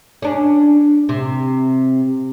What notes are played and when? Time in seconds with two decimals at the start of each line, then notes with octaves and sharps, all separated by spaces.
0.22 C#4 D4
1.09 C3